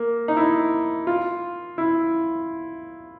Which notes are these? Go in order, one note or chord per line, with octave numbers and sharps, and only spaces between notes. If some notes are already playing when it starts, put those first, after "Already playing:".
Already playing: A#3
D#4
E4
F4
E4